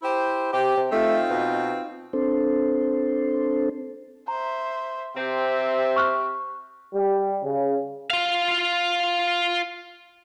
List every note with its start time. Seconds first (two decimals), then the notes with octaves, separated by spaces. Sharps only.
0.02 E4 G4 C5
0.53 C3 G4
0.77 C3
0.92 A3 C4 D#4 F4
1.30 B2
2.13 C4 D4 A4 C5
4.28 C5 E5 A#5
5.16 C3 C4 G4 E5
5.96 C#6 F6 F#6
6.94 G3
7.43 C#3
8.10 F4 F5